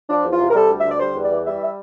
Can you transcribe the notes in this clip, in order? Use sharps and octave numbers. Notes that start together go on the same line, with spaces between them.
F3 D4
E2
F4
C3
A#4
G3 A4
D2
E5
D3 D5
G3 C5
E2
D5
E3
G3 E5
E5